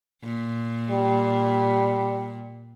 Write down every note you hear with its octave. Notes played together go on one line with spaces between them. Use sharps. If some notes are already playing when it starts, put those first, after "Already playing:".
A#2
G3